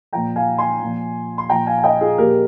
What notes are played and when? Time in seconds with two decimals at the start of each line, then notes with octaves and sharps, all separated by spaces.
0.13 A#2 F3 G5 A#5
0.36 F5 G#5
0.58 G#5 C6
0.81 A#2 F3
1.38 C6
1.50 A#2 F3 G5 A#5
1.67 F5 G#5
1.78 G#5
1.84 D#5 G5
2.01 F4 G#4
2.18 A#2 F3 G4 A#4